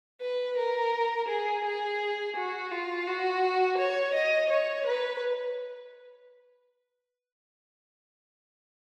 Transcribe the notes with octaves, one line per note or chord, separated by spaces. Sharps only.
B4
A#4
G#4
G#4
F#4
F4
F#4
C#5
D#5
C#5
B4